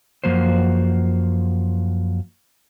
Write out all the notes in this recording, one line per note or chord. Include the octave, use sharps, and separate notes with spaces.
F#2 F3 A#3 F#4 C5